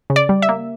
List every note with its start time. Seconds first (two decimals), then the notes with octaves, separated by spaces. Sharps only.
0.10 C#3
0.16 D5
0.29 G3
0.42 E5
0.49 A#3